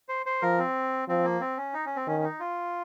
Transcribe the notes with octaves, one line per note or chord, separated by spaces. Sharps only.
C5
C5
F3 A#4
C4
F3 C4
A#3
C4
C#4
D#4
C#4
C4
D#3 C#4
D#4
F4